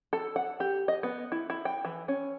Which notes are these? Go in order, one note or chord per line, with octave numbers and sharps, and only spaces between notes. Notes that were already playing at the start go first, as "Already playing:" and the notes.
A4
F#5
G4
D#5
B3
E4
E4
G5
E3
C#4